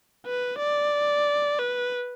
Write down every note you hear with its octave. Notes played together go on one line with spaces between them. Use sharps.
B4
D5
B4